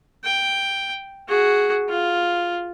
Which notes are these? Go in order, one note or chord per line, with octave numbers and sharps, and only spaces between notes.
G5
F#4 G#4
F4